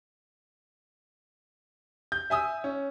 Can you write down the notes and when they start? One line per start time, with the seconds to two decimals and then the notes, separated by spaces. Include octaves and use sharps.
2.12 G6
2.30 E5 G#5 D#6 E6
2.64 C#4